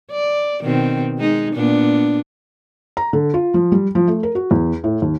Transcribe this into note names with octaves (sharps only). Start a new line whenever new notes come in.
D5
B2 D#3 C4
G#3 D#4
A#2 B3 D4
A#5
D3
F4
F3
G3
F3
A3
A#4
F#4
E2
A2
D#2